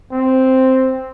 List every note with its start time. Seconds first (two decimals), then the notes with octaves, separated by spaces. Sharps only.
0.12 C4